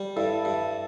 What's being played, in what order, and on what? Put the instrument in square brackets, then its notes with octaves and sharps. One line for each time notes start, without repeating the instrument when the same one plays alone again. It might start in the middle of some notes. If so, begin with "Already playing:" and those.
Already playing: [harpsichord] G3
[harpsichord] G2 [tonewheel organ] E4 A4
[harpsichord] G2